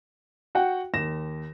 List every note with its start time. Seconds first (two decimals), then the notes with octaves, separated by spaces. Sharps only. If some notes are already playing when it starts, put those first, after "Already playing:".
0.55 F#4 F#5 G5
0.94 D#2 A#6 E7